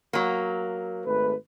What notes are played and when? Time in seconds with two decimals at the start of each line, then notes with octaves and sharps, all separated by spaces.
0.13 F#3 A#3
1.06 G#1 A3 B4